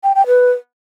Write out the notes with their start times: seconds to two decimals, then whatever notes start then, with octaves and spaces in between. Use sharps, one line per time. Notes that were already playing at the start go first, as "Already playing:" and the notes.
0.04 G5
0.15 G5
0.27 B4